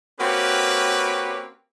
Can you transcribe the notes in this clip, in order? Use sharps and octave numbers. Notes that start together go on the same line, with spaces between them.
A#3 C4 C#4 F#4 G4 B4